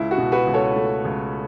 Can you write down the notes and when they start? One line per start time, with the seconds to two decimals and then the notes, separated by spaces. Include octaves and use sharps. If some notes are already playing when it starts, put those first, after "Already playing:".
Already playing: C#2 E4
0.11 F#4
0.18 B2
0.32 F#4 B4
0.47 C#2
0.54 A4 C#5
0.76 A3
1.05 C#2